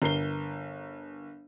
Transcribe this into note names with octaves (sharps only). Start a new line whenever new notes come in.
G1 A#4 C7 G7